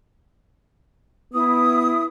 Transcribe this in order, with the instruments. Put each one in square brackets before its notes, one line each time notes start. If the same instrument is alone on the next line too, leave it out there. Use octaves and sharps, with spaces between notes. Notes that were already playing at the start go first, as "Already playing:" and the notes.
[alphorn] B3 [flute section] E4 D#6